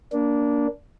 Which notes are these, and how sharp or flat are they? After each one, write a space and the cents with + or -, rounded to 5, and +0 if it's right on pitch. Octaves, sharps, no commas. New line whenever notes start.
A#3 +10 D4 -15